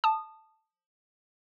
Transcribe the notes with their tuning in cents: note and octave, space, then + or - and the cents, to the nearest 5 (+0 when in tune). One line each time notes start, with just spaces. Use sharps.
A5 +0 D#6 -20